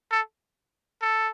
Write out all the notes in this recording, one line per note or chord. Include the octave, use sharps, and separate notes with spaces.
A4
A4